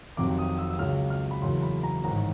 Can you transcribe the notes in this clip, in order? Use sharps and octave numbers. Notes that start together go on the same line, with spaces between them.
F1 F2 C3 D#3 F#3 D6
D#6
E6
E6
C#2 C#3 F#3 F6
F6
B5
F#1 E2 C#3 F#3 C6
B5
A#5
A1 G#2 D#3 A#5